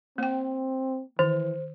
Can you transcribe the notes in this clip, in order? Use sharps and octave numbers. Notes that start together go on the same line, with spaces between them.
A#3 C4 G5
D#3 E3 C5